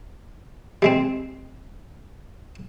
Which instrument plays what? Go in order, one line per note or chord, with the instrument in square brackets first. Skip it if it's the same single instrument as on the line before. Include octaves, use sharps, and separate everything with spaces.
[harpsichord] G3 G#3 C4